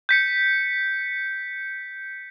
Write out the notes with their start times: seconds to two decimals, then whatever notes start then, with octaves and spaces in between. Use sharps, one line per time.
0.09 G6 B6 C#7